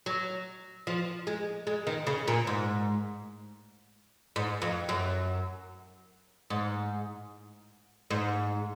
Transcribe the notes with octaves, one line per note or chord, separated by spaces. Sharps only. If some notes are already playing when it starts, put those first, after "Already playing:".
F#3
F3
G#3
G#3
D#3
C#3
A#2
G#2
G#2
F2
F#2
G#2
G#2